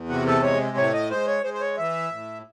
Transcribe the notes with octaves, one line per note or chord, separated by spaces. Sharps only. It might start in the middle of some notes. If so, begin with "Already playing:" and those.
Already playing: E2
C3 F#4
A4
G#3 C#5
A2 C#5
D#5
G#3 C5
C#5
G#3 C5
C5
C#5
E3 E5
A2